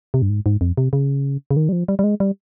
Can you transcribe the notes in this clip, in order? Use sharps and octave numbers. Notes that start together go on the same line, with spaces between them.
C3
G2
G#2
G#2
F2
C3
C#3
C#3
D#3
G3
F3
G3
G3
G#3
G3